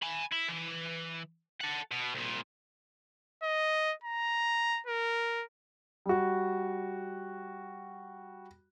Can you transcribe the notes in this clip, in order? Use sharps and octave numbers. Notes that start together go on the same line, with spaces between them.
G#5 B5
E4
E3
A4 F#5
B2
C2 A#2
D#5
A#5
A#4
G3 F#4